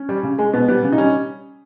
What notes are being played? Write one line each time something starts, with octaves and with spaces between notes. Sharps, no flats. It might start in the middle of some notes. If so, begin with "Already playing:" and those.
Already playing: C#4
G3
C#3
G#3
B2 B3
G3 B3
C#3
D#4
G3 C#4